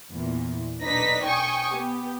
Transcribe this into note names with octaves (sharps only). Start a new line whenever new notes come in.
E2 A#2
B1 D4 D#4 B4 A#6 B6
G5 G#5 C#6 D#6
B3 G4